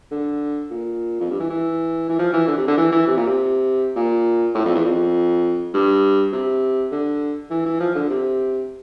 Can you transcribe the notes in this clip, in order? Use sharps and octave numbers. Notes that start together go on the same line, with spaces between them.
D3
A#2
F2
G2
E3
E3
E3
F3
E3
D3
C3
D3
E3
E3
C3
A#2
C3
A#2
A2
F2
E2
F2
G2
C3
D3
E3
E3
F3
D3
C3